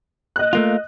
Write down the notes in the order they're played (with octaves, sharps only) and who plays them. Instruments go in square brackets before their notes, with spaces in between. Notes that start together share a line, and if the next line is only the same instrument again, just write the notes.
[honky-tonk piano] D#5 F#6
[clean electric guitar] A3 A#3 F4